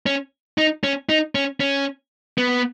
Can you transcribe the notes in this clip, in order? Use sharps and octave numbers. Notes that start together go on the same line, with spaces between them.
C#4
D#4
C#4
D#4
C#4
C#4
B3